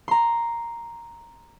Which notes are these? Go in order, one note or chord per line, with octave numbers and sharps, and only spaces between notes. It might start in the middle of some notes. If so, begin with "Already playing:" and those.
A#5 C6